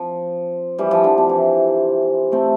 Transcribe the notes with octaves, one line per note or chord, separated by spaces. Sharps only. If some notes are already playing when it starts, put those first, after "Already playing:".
Already playing: F3 C4
E3 G3
F3
D3
C3
E3
A3 C4